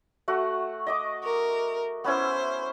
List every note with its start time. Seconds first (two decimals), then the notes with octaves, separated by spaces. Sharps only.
0.28 A3 F#4 F#5
0.87 D#5 D6 D#6
1.24 A#4
2.04 B3 C#4 E4 C5